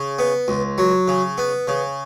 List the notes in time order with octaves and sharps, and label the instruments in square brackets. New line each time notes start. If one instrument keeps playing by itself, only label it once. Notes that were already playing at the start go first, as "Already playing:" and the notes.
Already playing: [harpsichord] C#3
B3
C#2
F#3
C#3
B3
C#3